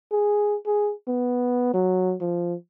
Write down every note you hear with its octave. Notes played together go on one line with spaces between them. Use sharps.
G#4
G#4
B3
F#3
F3